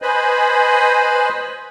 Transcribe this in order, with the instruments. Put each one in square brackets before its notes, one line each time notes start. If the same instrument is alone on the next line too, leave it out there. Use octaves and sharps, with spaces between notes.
[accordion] B4 C5 D#5 G#5 B5